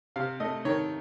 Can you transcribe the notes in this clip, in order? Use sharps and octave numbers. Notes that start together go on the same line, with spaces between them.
C3 F5
A3 D#5
D#3 C#5